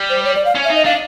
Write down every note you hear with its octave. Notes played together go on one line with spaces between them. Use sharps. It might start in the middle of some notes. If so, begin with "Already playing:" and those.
Already playing: G3
C5
C#5
D5
F5
C#4
E5
D#4
D#5
D4 F5